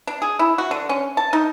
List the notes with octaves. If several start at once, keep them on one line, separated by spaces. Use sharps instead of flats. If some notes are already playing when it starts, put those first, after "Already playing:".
D4
G#4
E4
F#4
D3
C#4
A5
D#4